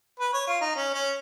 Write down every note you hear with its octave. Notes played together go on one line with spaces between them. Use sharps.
B4
C#5
F4
D#4
C#4
C#4